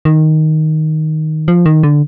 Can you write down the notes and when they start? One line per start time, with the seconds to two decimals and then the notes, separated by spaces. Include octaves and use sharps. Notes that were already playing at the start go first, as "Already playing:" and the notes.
0.05 D#3
1.48 F3
1.66 D#3
1.83 D3